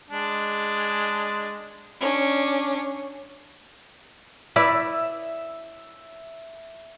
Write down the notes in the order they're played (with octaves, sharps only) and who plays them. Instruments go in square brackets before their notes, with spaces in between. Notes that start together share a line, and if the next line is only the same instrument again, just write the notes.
[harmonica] G#3 D4
[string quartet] C#4 D4
[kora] E4 B4 D5 [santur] E5